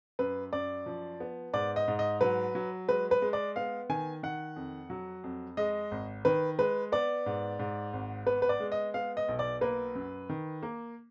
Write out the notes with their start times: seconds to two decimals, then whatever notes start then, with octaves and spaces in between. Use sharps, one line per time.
0.19 F#2 B4
0.53 F#2 D5
0.86 F3
1.20 B3
1.53 G#2 D5
1.76 D#5
1.88 G#2
1.99 D#5
2.21 F#3 B4
2.55 F#3
2.88 G#3 B4
3.11 B4
3.22 G#3
3.33 D5
3.56 B3 F5
3.89 D#3 G#5
4.23 D#3 F#5
4.56 F2
4.90 F#3
5.24 F2
5.57 G#3 D#5
5.91 G#1
6.25 D#3 B4
6.59 G#3 B4
6.92 B3 D5
7.26 G#2
7.59 G#2
7.93 G#1
8.26 B3 B4
8.42 B4
8.49 D5
8.60 G#3
8.72 D#5
8.94 B3 F5
9.17 D#5
9.29 B1
9.39 D5
9.61 A#3 B4
9.95 F#2
10.29 D#3
10.63 A#3